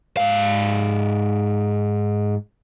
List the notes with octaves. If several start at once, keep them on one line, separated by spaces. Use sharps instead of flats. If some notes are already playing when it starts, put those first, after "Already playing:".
G#2 F5